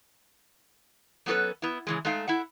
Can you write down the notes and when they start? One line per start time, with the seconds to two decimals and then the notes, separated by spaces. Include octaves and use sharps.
1.26 F#3 B3 C#4 G#4 A4 B4
1.62 B3 E4
1.87 C#3 E3 G#3
2.05 G#3 A3 D#4 F5
2.28 E4 E5 F#5